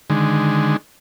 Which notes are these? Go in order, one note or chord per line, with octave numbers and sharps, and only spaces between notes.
D3 D#3 G#3